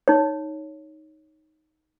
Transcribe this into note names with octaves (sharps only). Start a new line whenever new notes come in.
D#4 C#5